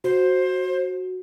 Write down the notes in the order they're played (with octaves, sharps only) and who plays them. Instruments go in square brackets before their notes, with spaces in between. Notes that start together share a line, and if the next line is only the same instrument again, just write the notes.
[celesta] F#4 [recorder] C5